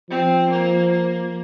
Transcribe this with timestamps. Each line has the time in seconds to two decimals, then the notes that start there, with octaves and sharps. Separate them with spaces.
0.10 F3 C4
0.51 A#3
0.92 A#3